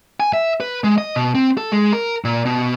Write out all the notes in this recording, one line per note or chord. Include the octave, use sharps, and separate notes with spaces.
G#5
E5
B4
G#3
D#5
B2
C4
A4
G#3
A#4
A#2
B2